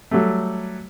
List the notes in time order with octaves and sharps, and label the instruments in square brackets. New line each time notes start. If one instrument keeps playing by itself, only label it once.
[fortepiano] F#3 G3 A3